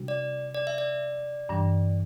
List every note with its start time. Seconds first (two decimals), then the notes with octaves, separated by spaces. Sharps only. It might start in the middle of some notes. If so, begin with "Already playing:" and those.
Already playing: C3 G3 D4 F#4
0.08 D5
0.54 D5
0.67 E5
0.78 D5
1.49 G2 E3 G3 D4